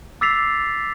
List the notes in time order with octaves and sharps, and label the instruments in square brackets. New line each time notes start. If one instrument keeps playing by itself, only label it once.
[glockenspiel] D6 E6 A6 B6 C7 F7